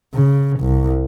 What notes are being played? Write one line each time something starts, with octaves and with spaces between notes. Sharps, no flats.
C#3
C2